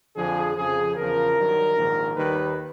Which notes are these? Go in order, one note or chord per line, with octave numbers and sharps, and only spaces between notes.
F2 D3 F3 G#4
F2 C#3 F3 G#4
E2 C#3 F3 A#4
G2 D#3 F#3
A#1 G#2 D#3
D#2 D#3 G3 B4